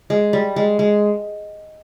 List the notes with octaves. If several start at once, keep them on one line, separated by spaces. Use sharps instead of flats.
G#3
G3
G#3
G#3